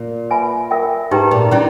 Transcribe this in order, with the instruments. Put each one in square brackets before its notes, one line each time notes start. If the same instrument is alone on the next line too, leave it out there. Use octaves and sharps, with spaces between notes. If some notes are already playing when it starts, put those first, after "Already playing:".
Already playing: [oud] A#2
[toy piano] B4 E5 G#5 B5
A#4 E5 G5
[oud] G#2 [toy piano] D#4 G4 B4 G5 A#5
[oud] A#2
[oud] D#3 G3 [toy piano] C#4 E4